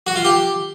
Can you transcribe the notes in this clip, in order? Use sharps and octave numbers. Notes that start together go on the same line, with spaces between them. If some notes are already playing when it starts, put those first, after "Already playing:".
F#4
F4
G4